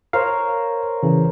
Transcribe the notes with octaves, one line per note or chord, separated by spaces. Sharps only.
A#4 C5 C#5 F5
C#3 E3